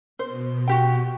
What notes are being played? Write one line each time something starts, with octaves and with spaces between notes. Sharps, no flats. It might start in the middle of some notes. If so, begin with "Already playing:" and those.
B2 C5
F#4 G4 G5